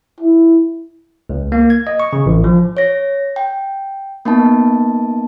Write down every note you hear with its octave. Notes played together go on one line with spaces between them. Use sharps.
E4
C#2
A#3
G#6
D#5
C#6
C#3
A1
F3
C#5 A#6
G5
A#3 B3 D#4 A5